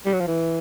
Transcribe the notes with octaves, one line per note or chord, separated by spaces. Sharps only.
G3
F#3
F3
E3